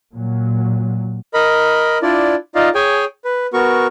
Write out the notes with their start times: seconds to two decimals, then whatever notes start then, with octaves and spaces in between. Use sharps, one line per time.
0.12 A#2 F#3
1.34 A#4 D#5 B5
2.02 D4 E4 F4 D5
2.55 D#4 F4 D5 D#5 F5
2.75 G#4 C#5 G5 G#5
3.25 B4
3.53 B3 F#4 A#4 C#6